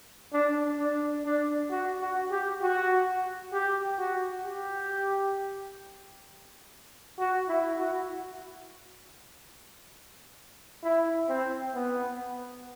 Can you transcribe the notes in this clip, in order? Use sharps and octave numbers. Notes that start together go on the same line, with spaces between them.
D4
D4
D4
F#4
F#4
G4
F#4
G4
F#4
G4
F#4
E4
F#4
E4
C4
B3